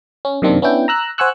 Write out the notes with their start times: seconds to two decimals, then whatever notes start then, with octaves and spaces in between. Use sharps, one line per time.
0.25 C#4
0.42 F#2 C3 D#3 A#3 C4 D4
0.62 B3 C#4 D4 E4 G5
0.88 A#5 E6 F#6
1.18 C5 F#5 G#5 C#6 E6 F#6